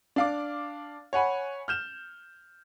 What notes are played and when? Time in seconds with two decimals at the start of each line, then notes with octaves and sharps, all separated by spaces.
0.16 D4 F5 D6
1.13 C#5 F#5 G#5 B5
1.68 F6 G6 E7